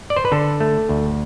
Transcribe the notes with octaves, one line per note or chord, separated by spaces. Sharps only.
D5
C5
B4
D3 A4
A3
D2